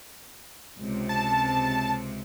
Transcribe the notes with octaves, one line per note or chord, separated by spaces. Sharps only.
C#2 C3
A5